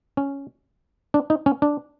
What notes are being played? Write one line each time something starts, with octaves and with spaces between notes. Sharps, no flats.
C#4
D4
D#4
C#4
D4